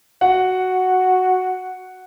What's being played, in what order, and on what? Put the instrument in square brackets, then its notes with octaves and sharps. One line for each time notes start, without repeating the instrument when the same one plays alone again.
[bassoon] F#4 [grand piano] F#5